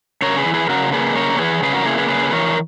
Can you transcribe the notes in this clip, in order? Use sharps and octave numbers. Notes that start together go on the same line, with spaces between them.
C#3 A#4 C#5
G#4 B4
E3
G#4 B4
C#3 F#4 A#4
A#3 G#4 B4
C#3 A#4 C#5
E3 G#4 B4
C#3 G#4 B4
F#4 A#4
A#3 E4 G#4
G#4 B4
C#3 G#4 B4
E3 A#4 C#5